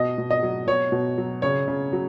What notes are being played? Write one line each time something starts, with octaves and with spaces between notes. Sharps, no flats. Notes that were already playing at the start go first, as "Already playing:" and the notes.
Already playing: B2 D#5
B2
D#5
F#3
B2 C#5
B2
F#3
C#3 C#5
C#3
F#3